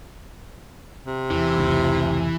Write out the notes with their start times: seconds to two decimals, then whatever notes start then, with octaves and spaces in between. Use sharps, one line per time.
1.06 C3
1.31 E2 E3
1.56 F1 C#2